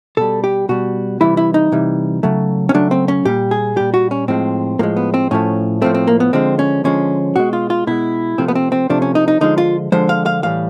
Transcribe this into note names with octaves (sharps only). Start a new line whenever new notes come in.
B2 G3 A4
G4
B2 G3 F#4
C3 E3 G3 E4
E4
D#4
C3 E3 G3
C#3 F#3 A3
C#4
C#3 F#3 A3 D4
C4
C#4
A#2 G3 G4
G#4
A#2 G3 G4
F#4
C#4
A2 F3 G#3 C4
A2 F3 G#3 A#3
B3
C4
A2 F3 A3 C#4
A2 F3 A3 C4
C4
A#3
B3
D3 F3 G#3 C4
C#4
D3 F3 G#3 C#4
B2 G#3 F#4
F4
F4
B2 G#3 E4
C3 F3 A3 C4
B3
C4
C4
C3 F3 A3 D4
C#4
D#4
D#4
D3 F3 G#3 D#4
F4
D3 F3 G#3 C5
F5
F5
A2 E3 G3 F5